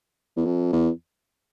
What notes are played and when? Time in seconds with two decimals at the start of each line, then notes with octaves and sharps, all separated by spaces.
0.36 E2
0.45 F2
0.73 E2